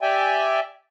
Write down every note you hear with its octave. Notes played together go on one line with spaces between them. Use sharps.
G4 D5 E5 G5 G#5